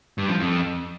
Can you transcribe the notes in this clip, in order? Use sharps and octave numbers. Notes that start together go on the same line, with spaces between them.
G2
F3
F2